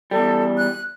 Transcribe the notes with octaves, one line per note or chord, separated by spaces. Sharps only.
E2 G3 A4
F#6